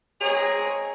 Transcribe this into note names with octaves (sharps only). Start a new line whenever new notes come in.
G#3 C4 G#4 C#5 A#5